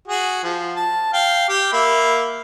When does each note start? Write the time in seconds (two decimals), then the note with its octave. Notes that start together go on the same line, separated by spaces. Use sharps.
0.08 F#4 G#4
0.44 F3
0.76 A5
1.13 F5 G5
1.49 G4
1.73 A#3 E5 B5